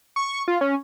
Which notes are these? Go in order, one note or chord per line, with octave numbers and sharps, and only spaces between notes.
C#6
F4
C#4